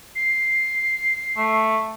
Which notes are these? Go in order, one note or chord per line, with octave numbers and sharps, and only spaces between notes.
C7
A3